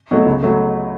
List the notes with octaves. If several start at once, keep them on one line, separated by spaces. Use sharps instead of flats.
B2 F#3 A3
C#2
F#3 A3